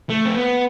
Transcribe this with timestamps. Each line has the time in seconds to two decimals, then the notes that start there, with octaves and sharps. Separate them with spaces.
0.10 A3
0.26 C4
0.36 B3